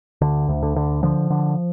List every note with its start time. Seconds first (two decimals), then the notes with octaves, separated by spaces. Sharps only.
0.21 D2 D3
0.49 D2
0.63 D3
0.76 D3
1.03 D3 F3
1.30 D3